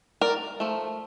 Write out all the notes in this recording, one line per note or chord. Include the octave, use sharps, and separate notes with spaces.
A#4 D5
F3 A3